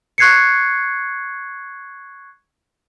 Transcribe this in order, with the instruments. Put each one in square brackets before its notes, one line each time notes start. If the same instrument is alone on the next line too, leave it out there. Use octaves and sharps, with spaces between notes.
[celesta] C#6 F#6 G#6 C7 C#7